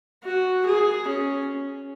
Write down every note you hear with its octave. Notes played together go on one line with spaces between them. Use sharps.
F#4
G#4
C#4